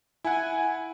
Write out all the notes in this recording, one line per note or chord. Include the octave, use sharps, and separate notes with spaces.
E4 F#5 G#5